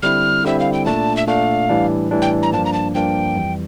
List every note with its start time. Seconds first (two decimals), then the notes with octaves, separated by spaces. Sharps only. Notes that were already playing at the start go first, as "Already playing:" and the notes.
0.03 D3 G3 C4 E4 F6
0.44 D3 G3 C4 E4 E5
0.60 F5
0.73 G5
0.86 A#2 A3 D4 A5
1.17 E5
1.27 A#2 A3 D4 F5
1.69 A2 E3 G3 D4
2.11 A2 E3 G3 D4
2.22 G5
2.43 A#5
2.53 G2 F3 A#3 D4 A5
2.65 A#5
2.73 A5
2.95 G2 F3 A#3 D4 G5
3.36 F2 E3 G3